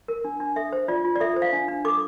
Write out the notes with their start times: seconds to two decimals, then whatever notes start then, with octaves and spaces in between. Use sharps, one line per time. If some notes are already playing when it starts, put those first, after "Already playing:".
0.08 A#4
0.25 D4
0.40 D4
0.56 A4 E5
0.73 C5
0.88 F4 D5
1.05 F4
1.16 D5
1.21 A4 E5
1.36 C5
1.42 F5
1.53 D4
1.68 D4
1.85 A4 D6